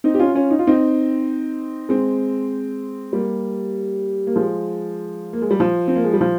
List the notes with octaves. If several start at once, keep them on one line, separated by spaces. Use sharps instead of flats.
C4 D#4
G4
C#4 F4
C#4 F4
D#4
F4
C4 D#4
G#3 C4
G3 A#3
A#3
F3 G#3
A#3
G#3
G3
F3
C4
A#3
G#3
G3
F3